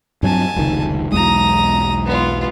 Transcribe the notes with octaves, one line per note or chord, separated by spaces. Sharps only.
G2 F#3 C4 G#5 A5
F1 C#2 D#3
B1 E2 G#3 A#5 D#6
B3 F4